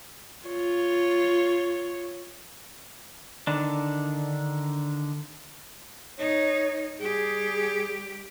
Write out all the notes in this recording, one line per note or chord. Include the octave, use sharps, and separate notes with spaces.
F4 C#5
D3 D#3 D4
D#4 C#5
G3 G4 G#4